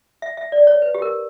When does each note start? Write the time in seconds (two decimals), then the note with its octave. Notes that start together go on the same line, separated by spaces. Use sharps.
0.22 E5
0.37 E5
0.52 D5
0.67 C#5
0.82 B4
0.95 G4
1.02 A#4